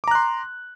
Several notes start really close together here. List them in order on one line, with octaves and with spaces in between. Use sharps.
D6 A#5 F#6 C6